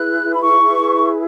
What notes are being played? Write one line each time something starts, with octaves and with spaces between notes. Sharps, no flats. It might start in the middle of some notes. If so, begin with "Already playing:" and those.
Already playing: E4 G#4 B4 F#6
B5
C#6